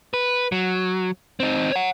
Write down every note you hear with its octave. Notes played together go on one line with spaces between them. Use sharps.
B4
F#3
C4 D#4
C#5 F#5